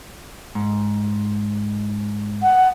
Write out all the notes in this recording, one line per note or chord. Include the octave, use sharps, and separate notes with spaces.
G#2
F#5